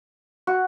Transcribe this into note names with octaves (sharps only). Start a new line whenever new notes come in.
F#4